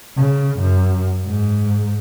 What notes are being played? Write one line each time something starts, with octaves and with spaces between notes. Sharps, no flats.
C#3
F#2
G#2